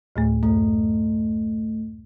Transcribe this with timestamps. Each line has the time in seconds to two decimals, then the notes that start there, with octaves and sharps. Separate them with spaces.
0.16 D2 A2 A3
0.43 F#2 A3